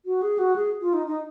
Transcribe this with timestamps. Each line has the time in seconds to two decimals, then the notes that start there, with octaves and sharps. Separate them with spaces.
0.06 F#4
0.22 G#4
0.38 F#4
0.56 G#4
0.81 F4
0.93 D#4
1.07 D#4